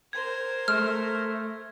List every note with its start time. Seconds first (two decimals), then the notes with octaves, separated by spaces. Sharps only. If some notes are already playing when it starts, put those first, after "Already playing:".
0.13 A#4 C5 G#6
0.68 A3 F6